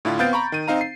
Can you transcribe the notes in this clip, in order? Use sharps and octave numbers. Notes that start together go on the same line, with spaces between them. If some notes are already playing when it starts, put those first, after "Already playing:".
A2 D3 E4 F4
B3 C4 F5 G6 A6 D7
A#5 B5 C#6
D#3 D#7
C4 D#4 F5 A#5
C7